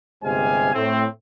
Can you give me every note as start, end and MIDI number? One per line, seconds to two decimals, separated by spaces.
0.24 0.74 31
0.24 0.74 48
0.24 0.74 56
0.24 0.74 72
0.24 0.74 77
0.24 0.74 80
0.75 1.06 45
0.75 1.06 57
0.75 1.06 60